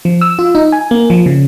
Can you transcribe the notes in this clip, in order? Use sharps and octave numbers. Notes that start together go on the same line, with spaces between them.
F3
E6
F4
D#4
G#5
A#3
F3
C#3